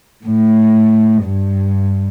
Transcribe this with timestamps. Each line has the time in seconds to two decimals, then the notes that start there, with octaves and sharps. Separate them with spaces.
0.24 A2
1.25 G2